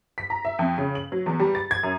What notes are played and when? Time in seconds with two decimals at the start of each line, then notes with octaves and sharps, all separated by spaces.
0.18 B6
0.30 A#5
0.45 E5
0.59 F2
0.78 C#3
0.95 F#7
1.12 F#3
1.26 E2
1.40 G3
1.55 A6
1.71 G#6
1.83 F#2